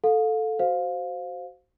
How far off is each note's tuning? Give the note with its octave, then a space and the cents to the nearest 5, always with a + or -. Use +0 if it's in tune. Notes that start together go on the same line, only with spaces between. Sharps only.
A4 +0 F5 +30
F#4 +20 C5 +0 F5 +15